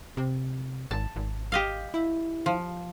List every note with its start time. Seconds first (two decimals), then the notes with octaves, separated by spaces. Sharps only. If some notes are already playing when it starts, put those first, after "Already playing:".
0.17 C3
0.91 G#1 A5
1.16 G#1
1.52 G4 D#5 F5
1.94 E4
2.46 F3